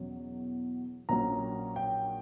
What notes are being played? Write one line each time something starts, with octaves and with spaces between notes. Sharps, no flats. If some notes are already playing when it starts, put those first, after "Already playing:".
Already playing: E2 B2 F#3 C#4
A#1 A#2 F#3 C#4 A#5
G5